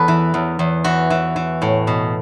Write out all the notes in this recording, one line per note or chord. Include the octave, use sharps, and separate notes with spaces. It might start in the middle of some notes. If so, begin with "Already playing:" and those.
Already playing: E2 A4 B4
E3
E2
E2
E3 F#4
E3
E3
A2
B2